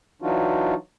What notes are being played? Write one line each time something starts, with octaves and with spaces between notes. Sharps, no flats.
E3 F#3 D4 D#4 F4 F#4